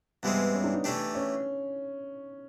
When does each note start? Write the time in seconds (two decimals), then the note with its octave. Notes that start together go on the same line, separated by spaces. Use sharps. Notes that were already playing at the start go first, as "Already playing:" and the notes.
0.23 G2 E3 G#3 B3 C4
0.54 C#4
0.64 D4
0.74 D#4
0.84 E3 A3 D4 G4
1.15 C#4